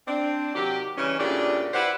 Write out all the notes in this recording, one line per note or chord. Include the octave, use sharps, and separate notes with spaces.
C4 D4
C3 D#3 F#3 G4
C#3 E3 G3 C#4
A2 C#3 A#3 D4 F4 G4
E4 G4 B4 C5 D5 F#5